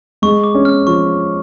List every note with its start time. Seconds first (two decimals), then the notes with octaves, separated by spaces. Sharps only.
0.22 G#3 C#6
0.44 D6
0.55 C#4
0.65 F6
0.87 F3 C#6